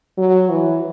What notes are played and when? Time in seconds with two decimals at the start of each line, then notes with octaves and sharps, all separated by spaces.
0.18 F#3
0.50 E3